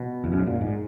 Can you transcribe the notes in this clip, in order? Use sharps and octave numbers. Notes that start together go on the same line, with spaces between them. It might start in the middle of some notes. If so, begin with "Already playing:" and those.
Already playing: B2
E2
F#2
G#2
A#2
G#2